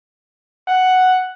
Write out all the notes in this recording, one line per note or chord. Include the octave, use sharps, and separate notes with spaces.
F#5